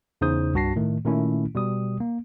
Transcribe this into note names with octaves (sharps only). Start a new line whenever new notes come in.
E2 C#3 D#4 C5 D#6 G6
C2 G2 F#4 A5 A#6 C7
A2 D#3 A3
A#2 D#3 A3 C#4 E4
B2 G3 D#6
A#3